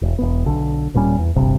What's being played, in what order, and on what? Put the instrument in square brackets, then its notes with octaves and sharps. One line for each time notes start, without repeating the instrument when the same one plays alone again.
[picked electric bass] E1
E1 B3
B1 D3
D#1 A#2 G3 C#4
E2
D#1 G#1 G2 C3